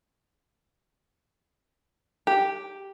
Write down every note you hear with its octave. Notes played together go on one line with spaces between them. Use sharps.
G4